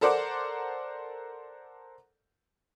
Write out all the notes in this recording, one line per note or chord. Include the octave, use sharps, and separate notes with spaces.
A4 A#4 C5 D5 F#5 D6